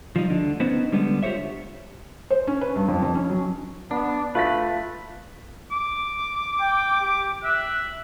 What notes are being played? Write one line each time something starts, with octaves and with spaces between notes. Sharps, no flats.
F3 G3 D#4
D2 D3 D4
B3 C#4 D#4 B4 C5
D3 G3 G#3 B3
F4 G4 A#4 C5 C#5 E5
C5
C#4
B4
G2
F2
F2
C#4
F#3
B3 D4
A3 F4 B4 A6 B6
D6
G5
G4
E5 F#6